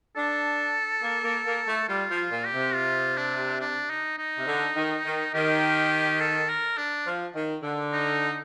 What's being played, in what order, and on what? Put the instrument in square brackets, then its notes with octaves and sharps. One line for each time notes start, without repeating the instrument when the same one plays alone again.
[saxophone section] D4 [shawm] A4
[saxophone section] A#3
A#3
A#3
A3
[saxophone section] G3 [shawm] F4
[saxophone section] F3
[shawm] F4
[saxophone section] A#2
[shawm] G4
[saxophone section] C3
[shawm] F4
D4
D4
D#4
D#4
[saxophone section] C3
D3
D#3
D#3
[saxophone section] D#3 [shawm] G4
[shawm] A4
A#4
D4
[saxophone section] F3
D#3
D3
[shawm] D#4